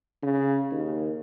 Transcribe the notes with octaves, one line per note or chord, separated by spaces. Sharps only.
C#3
D#2